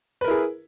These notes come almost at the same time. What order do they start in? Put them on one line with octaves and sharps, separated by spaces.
B4 A#4 E4 G#4